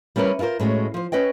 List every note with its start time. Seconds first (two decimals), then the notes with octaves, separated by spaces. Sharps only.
0.16 G3 C#4 E4 A#4 B4
0.39 E4 F4 G#4 A#4 C5
0.60 A2 G#3 C#4 F#4
0.94 F3 C5
1.12 C#4 B4 D#5 G5